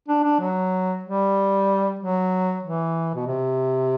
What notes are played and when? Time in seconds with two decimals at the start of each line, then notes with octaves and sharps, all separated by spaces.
0.08 D4
0.23 D4
0.40 F#3
1.03 G3
1.99 F#3
2.63 E3
3.15 B2
3.27 C3